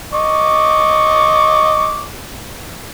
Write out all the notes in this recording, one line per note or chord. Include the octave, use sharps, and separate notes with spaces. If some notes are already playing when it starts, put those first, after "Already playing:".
D#5 C#6 D6